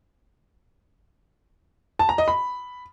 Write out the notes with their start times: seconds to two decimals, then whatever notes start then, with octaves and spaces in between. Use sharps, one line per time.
1.99 A5
2.09 A#5
2.18 D#5
2.28 B5